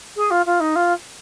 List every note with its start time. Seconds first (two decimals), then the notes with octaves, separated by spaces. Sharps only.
0.16 G#4
0.30 F4
0.46 F4
0.60 D#4
0.75 F4